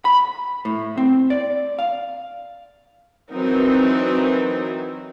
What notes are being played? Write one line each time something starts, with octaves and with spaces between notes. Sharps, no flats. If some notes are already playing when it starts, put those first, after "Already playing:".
B5
A2
C4
D5
F5
E3 F#3 C4 D#4 A#4